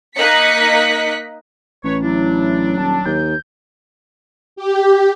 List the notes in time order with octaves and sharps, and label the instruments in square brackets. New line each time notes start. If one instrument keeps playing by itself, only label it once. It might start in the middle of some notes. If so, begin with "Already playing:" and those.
[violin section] A#3 D#4 D#5 F#6 B6 C#7
[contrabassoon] A1 [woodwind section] B4 C#5
[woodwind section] F#3 D4 [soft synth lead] E4
[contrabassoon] D#1 [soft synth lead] A5
[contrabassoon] D#2 [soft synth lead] G6
[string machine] G4